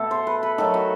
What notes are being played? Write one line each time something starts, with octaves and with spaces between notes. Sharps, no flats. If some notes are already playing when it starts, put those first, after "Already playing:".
Already playing: B2 A3 A4
C5
B4
B4
D#3 F#3 A3 A4
F#4